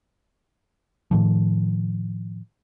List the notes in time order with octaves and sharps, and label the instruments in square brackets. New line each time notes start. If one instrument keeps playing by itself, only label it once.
[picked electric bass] A2 D#3 F3